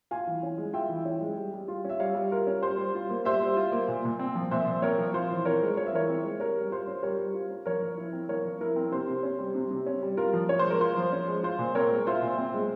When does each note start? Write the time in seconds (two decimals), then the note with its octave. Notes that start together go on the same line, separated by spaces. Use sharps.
0.11 F4 F5 G#5
0.27 E3
0.43 C#4
0.58 G#3
0.73 F4 E5 G5
0.89 E3
1.05 C#4
1.21 G#3
1.37 G3
1.53 G3
1.68 F4
1.85 C#4 E5
2.00 G3 C#5 F5
2.15 G3
2.31 F4 A#4
2.47 C#4
2.62 G3 C5
2.78 G3
2.95 F4
3.10 A#3
3.25 G3 C5 E5
3.42 G3
3.56 F4
3.72 A#3
3.88 A#2
4.05 A#2
4.19 C4
4.35 F3
4.51 A#2 C5 E5
4.67 A#2
4.82 C4 A#4 C#5
4.98 F3
5.14 F4 C5
5.30 E3
5.45 C4 A#4 C#5
5.62 G#3
5.77 F4 C#5
5.86 E5
5.93 E3 A#4 C#5
6.09 C4
6.24 G#3
6.40 G3 A#4 C#5
6.56 G3
6.71 F4 C5
6.87 C#4
7.03 G3 A#4 C#5
7.19 G3
7.34 F4
7.50 C#4
7.66 F3 A#4 C#5
7.82 F3
7.98 E4
8.13 C4
8.29 F3 A#4 C#5
8.45 F3
8.61 E4 A#4
8.76 C4
8.92 C3 C5
9.07 C3
9.23 C#4
9.39 G3
9.55 C3
9.71 C3
9.86 C#4
10.03 G3
10.17 F4 A#4
10.33 F3
10.49 C#4 C#5
10.59 C5
10.64 G#3
10.71 A#4
10.80 F4 C5
10.96 F3
11.12 C#4
11.28 G#3
11.43 F4 C5
11.59 A#2
11.75 C4 A#4 C#5
11.91 G#3
12.07 F4 C5 E5
12.22 A#2
12.38 C4
12.54 G#3